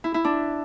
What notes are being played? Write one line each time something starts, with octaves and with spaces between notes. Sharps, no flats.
E4
E4
D4